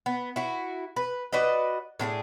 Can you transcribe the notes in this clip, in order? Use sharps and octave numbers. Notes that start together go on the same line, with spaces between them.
B3
E4 F#4
B4
F#4 B4 D5 D#5
A2 D4 F4 G#4